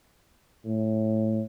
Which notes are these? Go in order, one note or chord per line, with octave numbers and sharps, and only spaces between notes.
A2